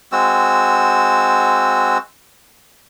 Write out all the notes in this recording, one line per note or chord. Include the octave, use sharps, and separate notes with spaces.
G#3 C4 F#4 E6